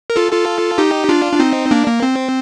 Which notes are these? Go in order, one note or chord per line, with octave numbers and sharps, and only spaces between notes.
A#4
F4 A4
F4 A4
D#4 G4
D4 F4
D4
C4 D#4
A#3 D4
A#3
C4